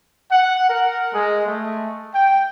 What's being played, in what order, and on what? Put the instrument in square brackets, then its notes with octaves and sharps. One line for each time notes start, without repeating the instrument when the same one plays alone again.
[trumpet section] F#5
A#4
G#3
A3
G5